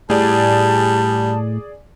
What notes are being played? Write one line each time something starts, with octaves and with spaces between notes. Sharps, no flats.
A2 G3 G#4 D5 G#5 A5